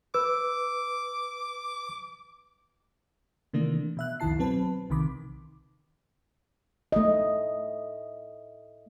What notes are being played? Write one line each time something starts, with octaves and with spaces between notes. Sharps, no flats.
B4 D6 E6
C3 D#3 E3 A3 A#3 D4
B2 E5 F#6
C2 F2 D#3 E4 A5 C7
B2 F#3 C4 B4 A5
B1 C3 D#3 B5 D6
A3 D#5